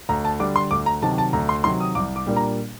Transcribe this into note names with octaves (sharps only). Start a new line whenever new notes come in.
D2 A#5
A5
D3 G3 D4 D6
C6
D2 D6
A#5
C3 D#3 F#3 A5
A5
D2 A#5
C6
C3 D#3 F#3 C6
D#6
C2 D6
D6
A#2 G3 A#3 D4
A#5